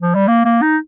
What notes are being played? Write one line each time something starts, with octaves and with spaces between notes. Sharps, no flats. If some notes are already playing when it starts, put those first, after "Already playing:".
F3
G3
A#3
A#3
D#4